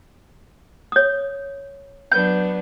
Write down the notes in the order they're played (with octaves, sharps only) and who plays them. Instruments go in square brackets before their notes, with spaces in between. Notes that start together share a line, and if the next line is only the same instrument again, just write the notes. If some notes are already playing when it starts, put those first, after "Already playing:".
[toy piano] C#5 D#6
[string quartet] F#3 B3 D4 [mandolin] G6